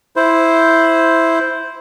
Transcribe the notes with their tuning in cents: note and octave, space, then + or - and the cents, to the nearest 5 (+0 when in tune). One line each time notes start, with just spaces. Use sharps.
E4 +0 C5 +0